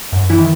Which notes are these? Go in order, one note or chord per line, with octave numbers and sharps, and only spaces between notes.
F#2
E3 E4
D#3